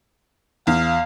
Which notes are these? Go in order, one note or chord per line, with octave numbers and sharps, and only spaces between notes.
E2 F5